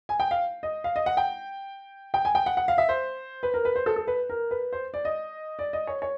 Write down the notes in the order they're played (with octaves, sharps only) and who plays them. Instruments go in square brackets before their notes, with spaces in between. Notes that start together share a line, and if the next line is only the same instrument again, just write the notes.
[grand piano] G#5
G5
F5
D#5
F5
D#5
F#5
G5
G5
G#5
G5
F#5
F#5
F5
E5
C5
B4
A#4
B4
C5
A4
A4
B4
A#4
B4
C5
D5
D#5
D5
D#5
C#5
C#5